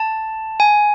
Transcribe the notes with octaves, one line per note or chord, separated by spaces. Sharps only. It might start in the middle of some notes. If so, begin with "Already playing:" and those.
Already playing: A5
G#5